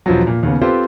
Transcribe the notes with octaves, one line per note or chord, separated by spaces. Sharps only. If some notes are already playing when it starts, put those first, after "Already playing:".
E1 F3 F#3
A#2
D#2 C#3 B3
C4 F4 G4 A4 B4 C5